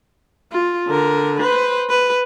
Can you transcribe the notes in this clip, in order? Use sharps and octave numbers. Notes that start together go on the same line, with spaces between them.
F4
D3 A#4
B4 C5
B4